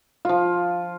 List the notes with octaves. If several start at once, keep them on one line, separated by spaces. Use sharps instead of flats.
F3 F4